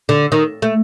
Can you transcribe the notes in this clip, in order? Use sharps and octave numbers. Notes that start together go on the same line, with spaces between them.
D3
D#3
A3